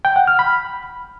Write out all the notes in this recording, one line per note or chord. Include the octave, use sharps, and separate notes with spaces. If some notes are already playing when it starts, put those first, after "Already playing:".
G5
F#5
F6
B5